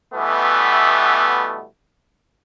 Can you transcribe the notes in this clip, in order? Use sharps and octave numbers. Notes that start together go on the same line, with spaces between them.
B2 E3 G3 A3 B3